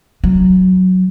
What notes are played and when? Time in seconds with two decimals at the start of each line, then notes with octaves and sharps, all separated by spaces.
0.24 F#3